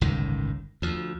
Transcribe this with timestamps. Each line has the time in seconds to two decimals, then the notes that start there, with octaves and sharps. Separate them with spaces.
0.01 G1 C#2 A2 D#3
0.82 D2 F3